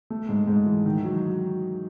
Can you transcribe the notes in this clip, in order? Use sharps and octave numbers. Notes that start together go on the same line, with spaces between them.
A3
G#2
G#2
E3
D#3
F#3